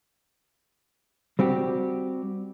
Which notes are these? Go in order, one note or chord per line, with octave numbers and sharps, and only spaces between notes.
G3 C4 F#4 G4